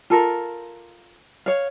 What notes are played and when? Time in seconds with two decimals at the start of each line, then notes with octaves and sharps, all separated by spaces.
0.10 F4 A4 A#4
1.46 C#5 F5